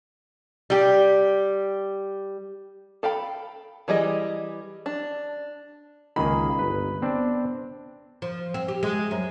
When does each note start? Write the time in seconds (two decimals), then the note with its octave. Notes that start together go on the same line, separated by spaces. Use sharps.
0.70 G3 G4
3.03 A4 F5 G5 B5
3.88 E3 G3 G#4 D#5
4.86 D4
6.16 C#2 D#3 A#3 G#4 B5
6.59 G1 B4
7.02 B3 C4 D4
8.22 F3
8.54 C4
8.68 G4
8.83 G#3
9.11 F#2